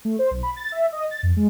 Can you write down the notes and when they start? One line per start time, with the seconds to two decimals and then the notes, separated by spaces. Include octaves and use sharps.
0.05 A3
0.19 C5
0.31 B1
0.43 B5
0.56 A6
0.72 E5
0.92 D#5
1.11 A6
1.23 F2
1.36 G#3